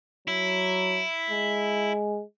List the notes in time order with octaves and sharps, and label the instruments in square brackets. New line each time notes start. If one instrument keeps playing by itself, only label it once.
[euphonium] F#3 [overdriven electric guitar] E4
[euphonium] G#3